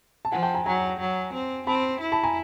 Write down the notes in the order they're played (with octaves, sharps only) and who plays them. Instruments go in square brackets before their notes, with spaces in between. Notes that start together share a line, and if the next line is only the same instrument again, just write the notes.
[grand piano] A5
[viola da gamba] F3 [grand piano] F#5 G#5
[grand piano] G5 A5
G#5 A#5
[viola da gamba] F#3 [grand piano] G#5 A#5
[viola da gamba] F#3
C4
[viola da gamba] C4 [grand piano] A5 B5
[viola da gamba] E4
[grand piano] A5 B5
G#5 A#5